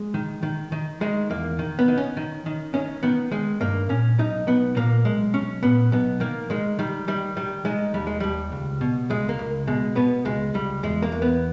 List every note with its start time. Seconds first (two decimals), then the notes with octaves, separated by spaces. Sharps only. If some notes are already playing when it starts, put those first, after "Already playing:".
Already playing: G#3
0.14 D#3
0.43 D#3
0.72 D#3
1.01 D#3 G#3
1.30 E2 A#3
1.59 D#3
1.79 B3
1.88 D#3
1.98 C#4
2.17 D#3
2.46 D#3
2.74 D#3 C#4
3.03 D#3 B3
3.32 D#3 G#3
3.61 G2 A#3
3.89 A#2 C#4
4.19 B1 D#4
4.47 B1 B3
4.77 A#2 A#3
5.05 B1 G#3
5.34 B1 C#4
5.63 A#2 B3
5.92 B1 B3
6.20 D#3 A#3
6.50 D#3 G#3
6.79 D#3 G3
7.08 D#3 G3
7.37 D#3 G3
7.65 D#3 G#3
7.94 D#2 G3
8.07 G#3
8.20 D#2 G3
8.52 C#2
8.81 B2
9.10 C#2 G#3
9.29 A#3
9.39 C#2
9.67 B2 G#3
9.96 B2 B3
10.25 C#2 G#3
10.54 C#2 G3
10.83 E2 G#3
11.02 A#3
11.12 E2
11.22 B3